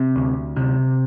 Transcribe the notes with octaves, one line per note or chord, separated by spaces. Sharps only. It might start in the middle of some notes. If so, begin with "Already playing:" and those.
Already playing: C3
D2
C3